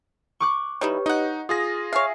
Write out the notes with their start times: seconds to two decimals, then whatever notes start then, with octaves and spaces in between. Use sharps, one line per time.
0.40 C#6 D6 F#6
0.81 G3 D#4 E4 G4 B4 C#5
1.06 D#4 D#5 F#5
1.49 F4 G#4 D#6 A#6
1.93 C#5 E5 F5 G#5 C7